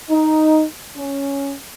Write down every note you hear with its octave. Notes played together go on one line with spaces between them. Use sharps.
D#4
C#4